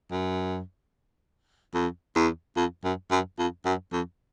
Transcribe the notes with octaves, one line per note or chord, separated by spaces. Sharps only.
F#2
F2
E2
F2
F#2
F#2
F2
F#2
F2